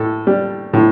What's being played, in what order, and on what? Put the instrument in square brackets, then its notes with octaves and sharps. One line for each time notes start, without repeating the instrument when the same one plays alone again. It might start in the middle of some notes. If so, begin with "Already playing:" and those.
Already playing: [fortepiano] A2 A4
G3
A2